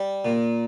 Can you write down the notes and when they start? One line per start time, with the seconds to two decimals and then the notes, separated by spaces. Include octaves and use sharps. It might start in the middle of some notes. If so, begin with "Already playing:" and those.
Already playing: G3
0.25 A#2